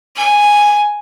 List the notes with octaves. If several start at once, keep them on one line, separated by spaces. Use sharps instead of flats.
G#5